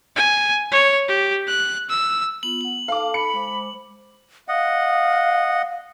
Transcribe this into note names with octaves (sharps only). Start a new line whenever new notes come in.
G#5
C#5
G4
F#6
E6
B3 F4 F#7
B3 F#5 F#7
A4 F5 A5 D6
B5 C#7
G#3 C5 D6
D#5 F5 F#5